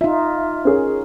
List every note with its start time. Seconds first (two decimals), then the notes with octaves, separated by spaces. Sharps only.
0.01 D#4 F4 E5
0.65 C#4 G#4 A#4